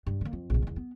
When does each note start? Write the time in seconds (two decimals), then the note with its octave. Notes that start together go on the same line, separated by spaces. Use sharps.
0.06 G2
0.21 D3 A#3
0.33 F2
0.50 A#1 C3
0.62 E2 D#3
0.76 B3